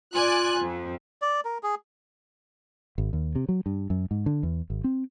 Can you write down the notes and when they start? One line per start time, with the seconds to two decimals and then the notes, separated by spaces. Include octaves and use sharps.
0.14 F4 D5 G#5 F#6
0.60 F2
1.22 D5
1.45 A#4
1.63 G#4
2.98 G#1
3.13 D#2
3.35 C3
3.49 F#3
3.66 G2
3.90 F#2
4.11 G#2
4.26 D3
4.43 E2
4.70 G#1
4.84 C4